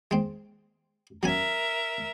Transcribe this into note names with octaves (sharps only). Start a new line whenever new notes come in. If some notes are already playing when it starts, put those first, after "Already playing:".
G#3 C4
F#3 C#4 A#4 E5 G#5